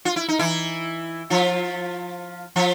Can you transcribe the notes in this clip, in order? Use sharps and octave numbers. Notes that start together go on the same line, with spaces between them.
F4
E4
D#4
E3 E4
F3 F4
F3 F4